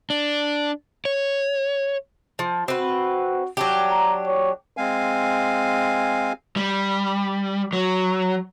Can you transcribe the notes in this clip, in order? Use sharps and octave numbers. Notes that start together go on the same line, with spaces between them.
D4
C#5
F3
C4 F#4 B4
F#3 D4 G4
A#5
C#5
G#3 C4 F5 G#5
G3
F#3